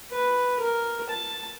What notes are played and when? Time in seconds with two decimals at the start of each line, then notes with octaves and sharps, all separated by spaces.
0.11 B4
0.60 A#4
1.10 A5